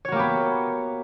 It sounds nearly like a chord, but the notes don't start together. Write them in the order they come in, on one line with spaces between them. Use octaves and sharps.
C#5 F#4 A#3 G4 B3